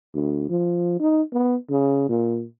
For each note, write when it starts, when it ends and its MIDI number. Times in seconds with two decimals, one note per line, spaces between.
0.14 0.45 38
0.49 0.97 53
1.00 1.22 63
1.32 1.56 59
1.70 2.07 49
2.09 2.44 46